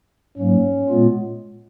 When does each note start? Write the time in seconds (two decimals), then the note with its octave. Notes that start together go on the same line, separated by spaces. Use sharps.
0.38 G#2 F#3 A#3 C#4
0.89 A#2 G#3 B3 F4